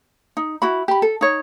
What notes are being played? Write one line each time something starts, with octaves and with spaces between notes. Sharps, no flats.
D#4
E4 F#4 B5
G4 B5
A4
D#4 C#5